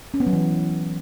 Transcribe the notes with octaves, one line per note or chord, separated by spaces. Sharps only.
C#4
B3
F#3
E3